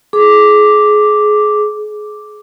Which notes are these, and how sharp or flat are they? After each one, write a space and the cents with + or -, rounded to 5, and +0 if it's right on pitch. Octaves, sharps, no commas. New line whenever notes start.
G#4 +25 D6 +0